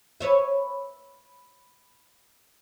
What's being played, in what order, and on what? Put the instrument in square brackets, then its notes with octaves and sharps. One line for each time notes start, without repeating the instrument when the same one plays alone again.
[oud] B4 C#5 E5